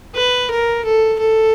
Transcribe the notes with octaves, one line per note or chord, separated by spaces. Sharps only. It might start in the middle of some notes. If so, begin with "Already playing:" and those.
B4
A#4
A4
A4